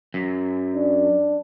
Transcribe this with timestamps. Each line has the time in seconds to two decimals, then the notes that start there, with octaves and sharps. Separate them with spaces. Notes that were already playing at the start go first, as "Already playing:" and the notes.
0.14 F#2
0.75 D4